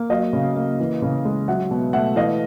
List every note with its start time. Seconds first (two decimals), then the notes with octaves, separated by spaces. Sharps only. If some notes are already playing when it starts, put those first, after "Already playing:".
Already playing: A#3
0.10 F#3 D#5 F5
0.33 C#3
0.56 A#3
0.80 E3
1.02 C#3
1.25 G#3
1.48 F#3 E5 F#5
1.71 B2
1.93 A3 E5 F#5
2.16 E3 D#5 F5